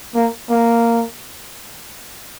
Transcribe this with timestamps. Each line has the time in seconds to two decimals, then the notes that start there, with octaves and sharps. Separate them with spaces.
0.15 A#3
0.50 A#3